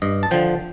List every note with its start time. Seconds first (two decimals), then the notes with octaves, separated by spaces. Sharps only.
0.02 G2 D#5
0.23 A5
0.31 D3 F3 G5